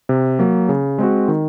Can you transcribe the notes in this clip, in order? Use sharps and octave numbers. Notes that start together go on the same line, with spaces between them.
C3
F#3 A#3
C#3
G#3 C4 F#4
D#3